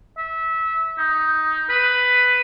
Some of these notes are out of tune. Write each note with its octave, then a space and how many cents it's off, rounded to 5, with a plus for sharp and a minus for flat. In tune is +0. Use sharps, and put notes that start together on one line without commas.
E5 -25
D#4 +10
B4 +10